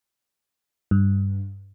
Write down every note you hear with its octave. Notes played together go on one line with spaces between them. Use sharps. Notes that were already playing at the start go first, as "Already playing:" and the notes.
G2